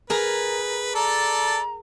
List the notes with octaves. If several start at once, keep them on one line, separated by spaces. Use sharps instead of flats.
G#4 A#4 B4
A4 D5 A5 A#5